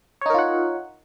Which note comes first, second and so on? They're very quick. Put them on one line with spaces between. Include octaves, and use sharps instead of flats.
C#5 D#4 A#4 F4 F#5